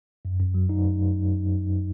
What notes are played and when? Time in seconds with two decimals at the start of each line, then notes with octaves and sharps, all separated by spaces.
0.25 F#2
0.40 F#2
0.54 F#3
0.69 D#4
0.84 F#2